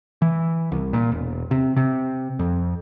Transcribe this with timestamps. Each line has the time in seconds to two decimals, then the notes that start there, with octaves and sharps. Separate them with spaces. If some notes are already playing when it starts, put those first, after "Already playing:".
0.22 E3
0.72 C2
0.93 A#2
1.12 E1
1.51 C3
1.77 C3
2.39 F2